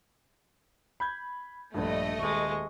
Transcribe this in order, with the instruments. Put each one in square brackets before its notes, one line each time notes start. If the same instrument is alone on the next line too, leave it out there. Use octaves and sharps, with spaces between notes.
[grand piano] B5 G6 G#6
[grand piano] A#1 G2 [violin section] A3 D#5
[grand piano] D#1 [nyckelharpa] G#3 C#6